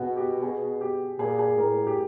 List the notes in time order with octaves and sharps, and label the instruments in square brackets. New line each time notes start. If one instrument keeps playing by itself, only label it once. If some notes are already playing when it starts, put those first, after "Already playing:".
Already playing: [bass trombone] B2 [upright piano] F#4 G#4
[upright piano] G4
G#4
G4
[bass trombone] A#2 [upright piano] G#4
[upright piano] G#4
[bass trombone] A2 [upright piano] A#4
[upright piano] G4